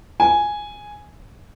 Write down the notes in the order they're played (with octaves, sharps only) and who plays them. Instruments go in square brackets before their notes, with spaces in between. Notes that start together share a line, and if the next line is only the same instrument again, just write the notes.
[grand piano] G#5